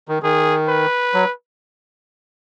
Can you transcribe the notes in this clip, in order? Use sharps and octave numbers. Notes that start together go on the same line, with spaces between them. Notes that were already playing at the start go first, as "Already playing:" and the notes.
D#3
D#3 G#4
B4
F#3